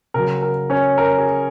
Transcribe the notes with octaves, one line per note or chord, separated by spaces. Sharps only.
C#3 F#3 A#4
A#4
C#4 C#5
A#4
G#4